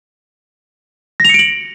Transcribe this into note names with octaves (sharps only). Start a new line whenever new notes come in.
A#6 C#7 D7 F7 F#7